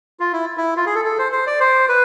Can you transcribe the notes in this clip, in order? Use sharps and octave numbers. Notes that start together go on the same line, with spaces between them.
F4
E4
E4
F4
G#4
A4
A4
C5
C5
D5
C5
B4